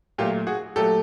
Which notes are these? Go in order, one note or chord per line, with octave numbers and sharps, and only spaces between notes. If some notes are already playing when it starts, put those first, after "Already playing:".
A#2 F#3 A3 F4 G4
F#4 G#4
A#2 F#3 A3 G4 A4